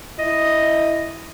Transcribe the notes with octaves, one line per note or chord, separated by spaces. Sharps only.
E4 D#5